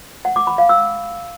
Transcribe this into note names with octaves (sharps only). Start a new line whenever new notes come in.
F#5
D6
B5
F5
E6